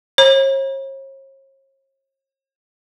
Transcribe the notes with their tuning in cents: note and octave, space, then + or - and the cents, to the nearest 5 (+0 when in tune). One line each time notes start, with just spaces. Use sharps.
C#5 -45 A#5 +40